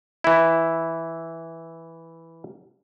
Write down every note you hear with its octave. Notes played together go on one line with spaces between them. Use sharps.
E3 E4